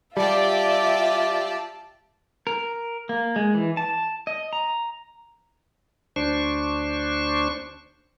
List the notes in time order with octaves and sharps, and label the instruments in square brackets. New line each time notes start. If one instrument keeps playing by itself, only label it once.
[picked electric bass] G3 [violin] F4 E5 [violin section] G4 D5 G5 [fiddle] A5
[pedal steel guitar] A#4
A#3
G#3
E3
A5
D#5
A#5
[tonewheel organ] D2 D4 C5 C#6